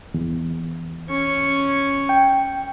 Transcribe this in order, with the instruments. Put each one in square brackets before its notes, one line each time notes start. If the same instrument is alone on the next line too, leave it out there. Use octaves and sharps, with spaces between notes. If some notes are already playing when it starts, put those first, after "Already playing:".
[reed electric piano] E2
[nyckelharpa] C#4 C#6
[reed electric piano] G5